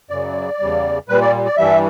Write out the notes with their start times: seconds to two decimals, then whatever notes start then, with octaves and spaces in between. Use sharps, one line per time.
0.10 F#2 C#3 F#3 D5
0.60 E2 C#3 G3
1.08 A#2 G3 B4
1.21 D5
1.45 D5
1.57 G2 E3 G3 E5